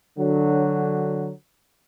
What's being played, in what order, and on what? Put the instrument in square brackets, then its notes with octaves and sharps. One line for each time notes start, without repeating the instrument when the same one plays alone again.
[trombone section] D3 F#3